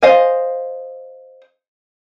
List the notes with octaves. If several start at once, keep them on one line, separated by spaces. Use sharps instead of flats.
C5 D#5 F5 G#5